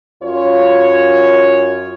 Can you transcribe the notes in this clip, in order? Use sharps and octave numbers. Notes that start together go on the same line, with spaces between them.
F#2 F4 C#5